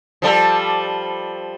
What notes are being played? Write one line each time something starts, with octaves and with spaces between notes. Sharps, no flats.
F3 G3 A4